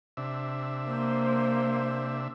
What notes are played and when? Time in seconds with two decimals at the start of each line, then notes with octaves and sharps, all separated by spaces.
0.17 C3 D4 E5
0.87 A#3 C5